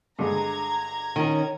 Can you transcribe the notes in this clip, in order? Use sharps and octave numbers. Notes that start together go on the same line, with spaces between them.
G2 D3 G#3 A#5 G#6
D#3 C#4